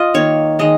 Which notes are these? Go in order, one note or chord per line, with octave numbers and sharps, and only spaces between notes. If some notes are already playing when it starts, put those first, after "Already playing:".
Already playing: F4 D#5
D#3 A#3 C#5
D#3 G#3 D#5